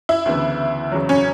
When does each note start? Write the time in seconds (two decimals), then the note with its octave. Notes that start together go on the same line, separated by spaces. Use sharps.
0.09 E4
0.26 D2 C#3 E3 B3
0.92 E2 C#3 F#3
1.09 C#4